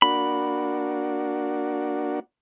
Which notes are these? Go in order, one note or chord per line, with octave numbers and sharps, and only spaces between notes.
A#3 D4 F#4 B5